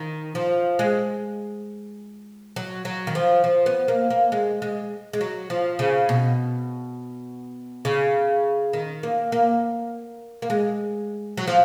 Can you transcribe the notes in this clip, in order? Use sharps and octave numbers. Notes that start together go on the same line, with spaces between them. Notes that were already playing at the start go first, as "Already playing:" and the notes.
Already playing: D#3
F3
G#3
F#3
F#3
D#3
F3
F3
B3
A#3
A#3
G#3
G#3
G#3
F#3
F3
C#3
B2
C#3
D#3
A#3
A#3
A#3
G#3
F#3
F3